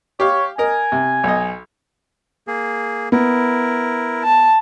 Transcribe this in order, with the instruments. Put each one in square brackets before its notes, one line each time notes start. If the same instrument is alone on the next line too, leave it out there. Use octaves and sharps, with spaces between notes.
[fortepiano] G4 F5 [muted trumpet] C#5
[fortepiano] A#4 D#5 [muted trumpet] G#5
[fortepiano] C3
B1 D#5
[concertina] A#3 G#4
[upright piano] B3 [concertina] E4 A#4
[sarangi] A5